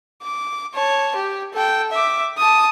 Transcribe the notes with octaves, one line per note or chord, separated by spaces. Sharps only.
D6
C#5 A5
G4
A4 G5
E5 D6
A5 D#6